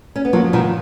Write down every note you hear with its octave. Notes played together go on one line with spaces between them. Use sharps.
C#4
B3
F3 F#3 A#3
B2 D#3 F3